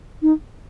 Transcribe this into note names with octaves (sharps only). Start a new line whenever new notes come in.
D#4